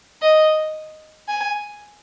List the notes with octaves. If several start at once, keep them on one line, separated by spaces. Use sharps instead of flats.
D#5
G#5